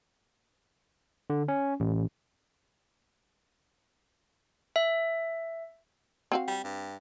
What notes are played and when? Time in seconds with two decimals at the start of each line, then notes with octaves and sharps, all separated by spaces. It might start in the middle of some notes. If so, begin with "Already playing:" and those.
1.30 D3
1.48 C#4
1.80 A1
4.76 E5
6.32 C4 F#4 F5
6.48 G3
6.64 G2